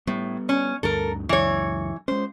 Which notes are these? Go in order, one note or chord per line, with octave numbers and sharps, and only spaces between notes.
A2 G3 B3
C#4
D2 G2 D3 A4 A#4
C#2 F#2 E3 C#5
G#3 C#4 C5